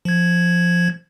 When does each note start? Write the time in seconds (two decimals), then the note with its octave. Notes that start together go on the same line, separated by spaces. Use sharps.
0.05 F3 G#6